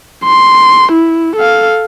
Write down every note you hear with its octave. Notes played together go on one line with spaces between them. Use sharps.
C6
E4
A4 F5